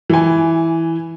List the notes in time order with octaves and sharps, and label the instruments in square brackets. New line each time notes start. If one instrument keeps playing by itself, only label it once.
[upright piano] E3 G#5